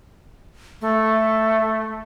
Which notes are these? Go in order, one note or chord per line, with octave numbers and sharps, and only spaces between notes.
A3